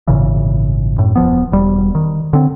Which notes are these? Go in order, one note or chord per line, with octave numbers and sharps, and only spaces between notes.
G#1 A#2 C#3 E3
F#2 A2
E1 F3 B3
E1 G3
D#3
D3 C4